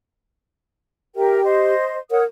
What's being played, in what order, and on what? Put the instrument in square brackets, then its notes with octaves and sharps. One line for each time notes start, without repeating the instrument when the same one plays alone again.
[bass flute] G4 [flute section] A#4 E5 G5
[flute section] C5 D#5
[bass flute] A#4 [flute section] C#5 F#5 D#6